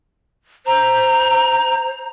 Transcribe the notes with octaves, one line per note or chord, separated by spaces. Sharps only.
C5 A#5